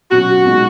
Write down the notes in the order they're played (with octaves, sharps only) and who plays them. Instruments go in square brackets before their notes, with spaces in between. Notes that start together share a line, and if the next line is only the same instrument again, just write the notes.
[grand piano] B2 F#3 C#4 [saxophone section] F#4
[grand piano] B2 G#3 D#4